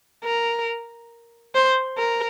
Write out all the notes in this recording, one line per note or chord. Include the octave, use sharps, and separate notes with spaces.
A#4
C5
A#4